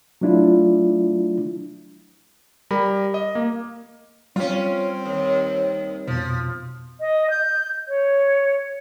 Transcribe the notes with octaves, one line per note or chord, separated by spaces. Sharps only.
F#3 A3 D4 E4 F4
G3 A#4 B5
D#5
A#3
G3 C4 C#4 F4
D#2
F2 B2 F3
D#5
G6
C#5